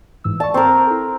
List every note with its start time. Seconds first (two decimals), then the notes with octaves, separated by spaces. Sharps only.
0.24 G#2 E3 E6
0.40 D5 A5 C#6
0.54 C4 A#4 C#6
0.87 E4 A4